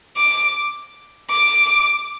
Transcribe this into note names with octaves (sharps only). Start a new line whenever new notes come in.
D6
D6